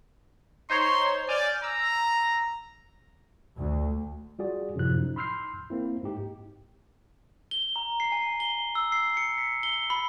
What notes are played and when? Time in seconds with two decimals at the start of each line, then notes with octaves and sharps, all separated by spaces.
0.70 D#4 C5 C#5 C6
1.29 D5 G#5 F6 G6
1.64 A#5 E6
3.57 D2
4.39 G3 F4 F#4 G#4 D5
4.75 F#2 A2 C3 F3 E4 F#6
4.98 D#4
5.16 B5 C6 E6 F6 G6 C7
5.70 A#3 C4 E4
6.03 G#2 D#4 G4
7.51 G7
7.76 A#5
8.00 C7
8.12 G#5
8.40 G7
8.75 E6
8.92 C7
9.17 C#7
9.38 B6
9.63 G7
9.90 B5